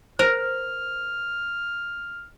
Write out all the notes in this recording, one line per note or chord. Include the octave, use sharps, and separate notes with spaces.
A#4 C5 F6